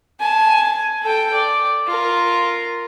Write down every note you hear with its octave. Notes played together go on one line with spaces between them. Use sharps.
G#5 A5
A4 G5
D5
F4 A#4